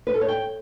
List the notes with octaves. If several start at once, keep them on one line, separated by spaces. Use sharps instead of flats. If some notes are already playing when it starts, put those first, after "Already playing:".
B4
A4
C#5
G5